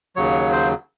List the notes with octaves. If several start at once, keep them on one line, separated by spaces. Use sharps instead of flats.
D#2 C#3 F#3 C#5
C5